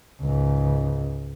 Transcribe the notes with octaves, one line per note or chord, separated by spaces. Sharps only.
C#2 G#2